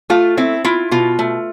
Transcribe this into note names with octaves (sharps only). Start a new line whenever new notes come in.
A3 F4
C4 E4
E4 F4
B2 F4
A3